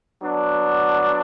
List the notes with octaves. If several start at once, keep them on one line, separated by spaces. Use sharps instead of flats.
F#3 B3 D4